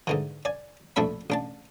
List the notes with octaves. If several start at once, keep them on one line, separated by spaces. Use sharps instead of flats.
G#2 D3 E3
D5 G#5
A#1 F2 A3 D4 E5 B5
A1 D4 A5